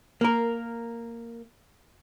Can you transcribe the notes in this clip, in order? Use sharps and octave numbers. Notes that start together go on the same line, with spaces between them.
A#3 A#4